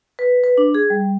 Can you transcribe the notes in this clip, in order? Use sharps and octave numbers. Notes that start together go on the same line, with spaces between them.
B4
B4
D4
G#4
G3